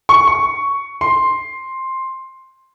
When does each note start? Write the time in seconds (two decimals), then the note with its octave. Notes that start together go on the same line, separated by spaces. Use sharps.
0.09 C#6
0.27 C#6
1.01 C6